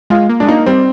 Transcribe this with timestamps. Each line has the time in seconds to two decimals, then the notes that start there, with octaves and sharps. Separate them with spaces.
0.10 G#3 F4
0.29 A#3
0.40 G#3 D4
0.48 A#3 D#4
0.66 G3 C4